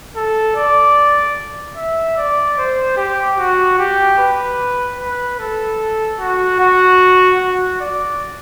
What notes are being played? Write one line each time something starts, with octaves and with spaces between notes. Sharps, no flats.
A4
D5
E5
D5
C5
G4
F#4
G4
B4
B4
A4
F#4
F#4
F#4
D5